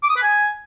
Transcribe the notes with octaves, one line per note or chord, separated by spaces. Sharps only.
D6
D#6
B4
G#5